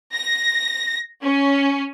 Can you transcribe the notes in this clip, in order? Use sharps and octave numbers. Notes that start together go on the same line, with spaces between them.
A#6
C#4